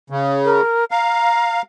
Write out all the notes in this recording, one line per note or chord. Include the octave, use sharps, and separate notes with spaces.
C#3
A#4
F5 A#5